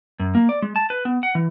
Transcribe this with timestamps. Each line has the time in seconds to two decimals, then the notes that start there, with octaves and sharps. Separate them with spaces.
0.20 F#2
0.35 A#3
0.49 D5
0.62 G#3
0.76 A5
0.90 B4
1.05 B3
1.23 F#5
1.35 E3